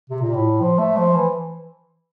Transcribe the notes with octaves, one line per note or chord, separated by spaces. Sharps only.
C3
A#2
A2
F3
A3
F3
E3